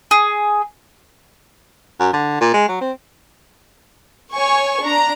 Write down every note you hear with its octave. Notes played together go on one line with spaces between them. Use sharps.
G#4
F#2
D3
A#2
G#3
F#3
C4
C#5 G#5 C#6
D4 A#5